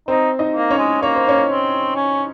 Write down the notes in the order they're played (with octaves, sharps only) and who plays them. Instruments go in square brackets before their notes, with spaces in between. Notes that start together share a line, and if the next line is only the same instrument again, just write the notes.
[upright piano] C4 C5 [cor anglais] D#4
[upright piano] D#4 D#5
[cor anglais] A#3
[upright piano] C#4 C#5
[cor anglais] G#3
[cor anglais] A#3 [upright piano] C#5
[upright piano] C5
C#4 C#5
[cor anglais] C4
C#4